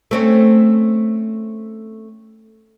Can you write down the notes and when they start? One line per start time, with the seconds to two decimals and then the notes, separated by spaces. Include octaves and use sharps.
0.11 A3 C4 C#4